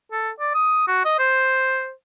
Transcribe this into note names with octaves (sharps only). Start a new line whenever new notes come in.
A4
D5
D#6
F#4
D#5
C5